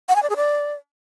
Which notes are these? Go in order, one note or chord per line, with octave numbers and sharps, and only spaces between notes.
F#5
G#5
D5
G#4
D5